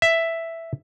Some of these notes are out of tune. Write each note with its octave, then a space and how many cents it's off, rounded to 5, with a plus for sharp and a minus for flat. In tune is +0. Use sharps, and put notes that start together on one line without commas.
E5 +5